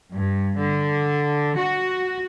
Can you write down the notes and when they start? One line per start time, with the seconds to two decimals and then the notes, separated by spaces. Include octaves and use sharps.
0.11 G2
0.57 D3
1.55 F#4